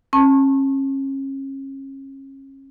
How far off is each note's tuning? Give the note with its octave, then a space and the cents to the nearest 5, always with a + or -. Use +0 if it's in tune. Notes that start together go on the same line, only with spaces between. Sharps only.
C#4 -35 A5 +0 C#6 -25